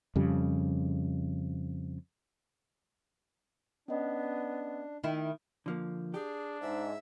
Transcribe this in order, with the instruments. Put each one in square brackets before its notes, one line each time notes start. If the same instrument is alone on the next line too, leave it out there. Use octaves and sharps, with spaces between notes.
[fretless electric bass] F2 C#3 G3
[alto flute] B3 [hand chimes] C#4 D#5 [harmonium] D4
[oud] D#3 E4
[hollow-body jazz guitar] D3 F3 A#3
[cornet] D4 [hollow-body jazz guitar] G4 [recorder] G#4
[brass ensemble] G#2 [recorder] E5